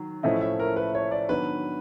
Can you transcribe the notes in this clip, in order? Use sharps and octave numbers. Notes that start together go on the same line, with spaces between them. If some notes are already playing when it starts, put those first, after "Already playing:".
Already playing: D#3 F#3
A2 F3 A3 C#4 E4 D#5
E5
A#4
B4
C#5
D5
D#3 F#3 B3 D4 B4